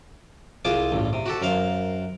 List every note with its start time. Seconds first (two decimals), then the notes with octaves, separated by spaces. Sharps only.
0.65 C2 F4 G#4 C5 D6
0.92 A1 G2
1.13 C3
1.26 F#4 G4 A4
1.42 F#2 A#4 C5 F5